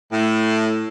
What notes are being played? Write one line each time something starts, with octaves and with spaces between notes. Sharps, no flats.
A2